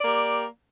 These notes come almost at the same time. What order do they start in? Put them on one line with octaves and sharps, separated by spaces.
D5 A#3 G4